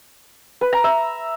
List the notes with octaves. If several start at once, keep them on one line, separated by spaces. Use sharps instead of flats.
B4
A#5
E5